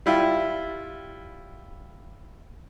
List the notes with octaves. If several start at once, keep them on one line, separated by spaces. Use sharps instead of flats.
G3 E4 F4